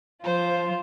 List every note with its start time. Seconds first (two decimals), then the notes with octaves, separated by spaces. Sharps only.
0.24 F3 F4 C5